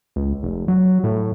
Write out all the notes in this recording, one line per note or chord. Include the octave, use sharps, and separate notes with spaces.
C#2
F1
F#3
A2